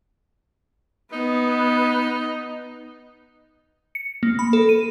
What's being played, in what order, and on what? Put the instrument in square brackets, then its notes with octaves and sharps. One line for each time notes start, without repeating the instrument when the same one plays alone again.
[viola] B3 [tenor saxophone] D#4
[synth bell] C#7
A#3
B5
A4
D#7